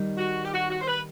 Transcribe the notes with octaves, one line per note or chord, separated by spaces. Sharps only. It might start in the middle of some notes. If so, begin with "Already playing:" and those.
Already playing: D#3 G3 D#4
F#4
G4
F#4
F#4
C5
B4